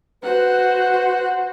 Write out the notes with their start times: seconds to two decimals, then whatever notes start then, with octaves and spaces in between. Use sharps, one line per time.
0.23 F#4 B4 C5 F#5